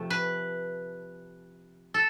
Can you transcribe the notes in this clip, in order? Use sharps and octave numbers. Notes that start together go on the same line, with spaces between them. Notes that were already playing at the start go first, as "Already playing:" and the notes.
Already playing: C3 F3 A3
B4
A4